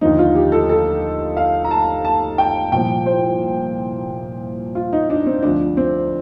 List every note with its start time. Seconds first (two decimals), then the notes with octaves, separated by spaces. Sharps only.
0.01 D#2 D3 F3 D#4
0.19 F4
0.35 G4
0.52 A4
0.69 A4
1.37 F5
1.65 A#5
1.71 A5
2.05 A5
2.38 G5
2.72 C2 A#2 F3 G5
3.06 C5
4.75 F4
4.93 D#4
5.10 D4
5.26 C4
5.43 D2 D3 F3 D4
5.77 C4